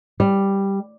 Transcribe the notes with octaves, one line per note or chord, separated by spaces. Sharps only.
G3